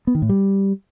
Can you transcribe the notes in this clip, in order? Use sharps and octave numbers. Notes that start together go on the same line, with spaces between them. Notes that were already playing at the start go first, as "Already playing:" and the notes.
B3
D#3
A2
G3